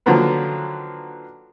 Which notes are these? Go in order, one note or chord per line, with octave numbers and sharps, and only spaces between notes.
D3 D#3 F3 F#3 A#3 B3